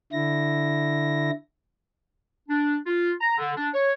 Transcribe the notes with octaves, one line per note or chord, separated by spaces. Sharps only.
D3 E4 A#6
D4
F4
A#5
D3
D4
C#5